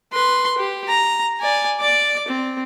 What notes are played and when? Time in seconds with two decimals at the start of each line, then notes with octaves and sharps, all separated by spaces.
0.12 B4 C6
0.58 G4
0.88 A#5
1.41 D5 G#5
1.80 D5 D6
2.28 C4